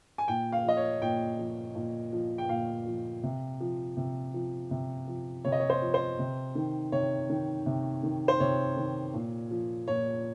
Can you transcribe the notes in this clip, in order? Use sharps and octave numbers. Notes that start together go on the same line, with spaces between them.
G#5
A#2 G5
F5
F3 D#5
C#5
A#2 G5
F3
A#2
F3
G5
A#2 F5
F3
C3
F3
C3
F3
C3
F3
C3 C#5
D#5
C#5
C5
F3
C5
C3
D#3
C3 C#5
D#3
C3
D#3
C5
C3 C#5
D#3
A#2
F3
A#2 C#5